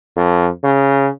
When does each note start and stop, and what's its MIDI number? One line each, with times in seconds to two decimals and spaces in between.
0.17 0.49 41
0.64 1.09 49